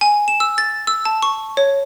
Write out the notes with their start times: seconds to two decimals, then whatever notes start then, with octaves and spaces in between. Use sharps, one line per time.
0.01 G#5
0.28 E7
0.40 E6
0.58 A6
0.87 E6
1.05 A5
1.22 C#6
1.57 C#5